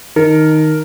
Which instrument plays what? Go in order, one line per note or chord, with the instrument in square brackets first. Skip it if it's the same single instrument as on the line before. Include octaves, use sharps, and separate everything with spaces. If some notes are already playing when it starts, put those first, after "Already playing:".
[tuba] D#3 [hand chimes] D#4 [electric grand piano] A#4